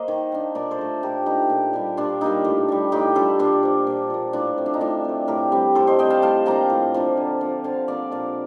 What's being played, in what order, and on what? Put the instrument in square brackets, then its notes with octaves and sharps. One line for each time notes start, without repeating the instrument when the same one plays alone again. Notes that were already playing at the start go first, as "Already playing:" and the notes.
Already playing: [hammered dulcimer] A#3 C5 D#5
D#3
A#3 D4
A#2 A#4 D5
A4 C5
A3 D4
A#2 G4 A#4
A3 D4 D#4 G4
A#2
G3 A#3 D4
A#2 D4 F4
G3 A#3 D4 D#4
A2
G3 D4
A2 D#4 G4
G3 D4 F4 A4
A#2 D4 F4
F3 A#3
A#2
F3 A#3
A2 D4 F4
A3 C4
D4
D#4
A2 D4 F4
A3 C4
A2 G4 A#4
G3 C4
A2 A4 C5
C5 D#5
G3 C4 D#5 G5
F5 A5
A2 F5 A5
F3 A#3 D4 G5 A#5
A2
F3 A#3 D4
D3
F3 A#3 D4
D3 F5 A5
F3 A#3 D4 D5 F5
A#2 D5 F5